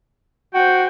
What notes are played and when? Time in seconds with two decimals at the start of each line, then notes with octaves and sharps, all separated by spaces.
0.54 F#4 C5 G5